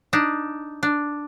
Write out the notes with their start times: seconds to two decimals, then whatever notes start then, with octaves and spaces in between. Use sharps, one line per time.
0.13 D4 D#4
0.83 D4